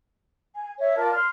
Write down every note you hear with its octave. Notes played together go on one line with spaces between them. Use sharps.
G#5
C#5 E5
F4 A#4 D5 A5
C6 F6